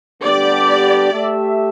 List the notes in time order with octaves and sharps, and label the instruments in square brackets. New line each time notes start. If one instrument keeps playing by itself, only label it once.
[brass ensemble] D3 G3 B3 D4 G4 [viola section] D5
[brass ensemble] A3 G4 E5